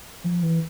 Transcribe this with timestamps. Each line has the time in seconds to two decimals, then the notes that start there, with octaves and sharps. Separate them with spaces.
0.24 F3
0.42 E3